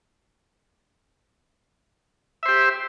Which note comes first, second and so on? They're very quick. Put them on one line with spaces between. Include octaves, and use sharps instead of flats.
E5 C5 G4